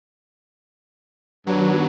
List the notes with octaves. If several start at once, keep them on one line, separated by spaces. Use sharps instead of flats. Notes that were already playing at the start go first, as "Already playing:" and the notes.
G2 D#3 F#3 G3 B3